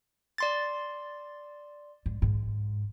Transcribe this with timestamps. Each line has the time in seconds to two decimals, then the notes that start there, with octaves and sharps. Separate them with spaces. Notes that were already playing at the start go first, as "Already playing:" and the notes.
0.38 D5 C6 A6
2.06 G#2
2.22 G#2